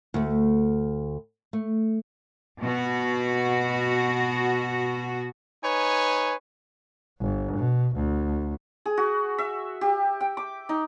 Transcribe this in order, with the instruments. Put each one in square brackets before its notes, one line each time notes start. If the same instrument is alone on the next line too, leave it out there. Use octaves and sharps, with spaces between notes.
[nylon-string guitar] D2 A3
A3
[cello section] B2 F#4
[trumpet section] D#4 B4 C#5 G#5
[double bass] G1
B2
D2
[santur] G#4
F#4
E5
G4
G5
D6
D#4